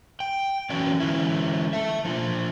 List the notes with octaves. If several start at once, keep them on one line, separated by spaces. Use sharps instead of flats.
G5
E3 F#3 C#4 D4 D5
D3 E3 G#3 C#4 E4
E5 A5
F3 D4 F4